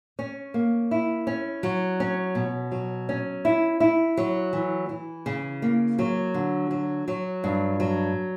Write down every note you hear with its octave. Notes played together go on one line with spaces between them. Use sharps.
C#4
A#3
E4
C#4
F#3
C#4
B2
F#3
C#4
E4
E4
F#3
E3
E3
C#3
A#3
F#3
D3
F#3
F#3
G2
F#3